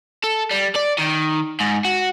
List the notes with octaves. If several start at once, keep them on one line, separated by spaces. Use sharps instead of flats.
A4
G3
D5
D#3
G#2
F#4